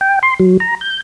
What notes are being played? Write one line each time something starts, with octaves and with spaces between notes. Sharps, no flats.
G5
C6
F#3
A#5
G6